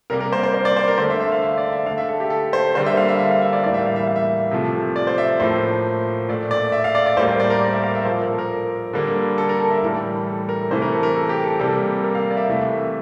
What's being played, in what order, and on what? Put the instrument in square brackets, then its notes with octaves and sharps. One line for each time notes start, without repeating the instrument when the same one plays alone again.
[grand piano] C3 G3 A#3 A#4
A#4
C5
C5
C5
D5
C5
A#4
D3 A3 C5
E5
E5
F5
E5
D5
E5
D3 A3 F5
E5
A4
G4
A4
C5
D3 G3 A#3 C5
E5
F5
E5
E5
F5
E5
D5
A2 E3 G3 A#3 D5
E5
F5
E5
F5
E5
C3 F3 A3
D5
C5
E5
A2 F3 A#3 C5
A#2 A3 D5
D5
E5
F5
D5
D5
A2 G3 A#3 C5
C5
D5
A#4
D5
E5
F5
E5
A#2 F3 A#3 C5
A#4
A4
A#4
D3 G3 A#3
A4
A#4
A4
E5
A2 E3 G3
A4
A#4
C3 E3 A3 C5
A#4
A4
A#4
A4
G4
A4
C3 G3 A#3 A4
A#4
F5
D5
E5
C3 E3 A3